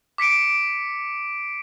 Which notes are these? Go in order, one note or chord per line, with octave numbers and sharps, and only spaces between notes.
D6 B6 C#7 D7